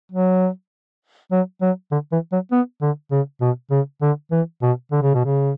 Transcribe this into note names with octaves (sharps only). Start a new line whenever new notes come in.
F#3
F#3
F#3
D3
E3
F#3
B3
D3
C#3
B2
C#3
D3
E3
B2
D3
C#3
B2
C#3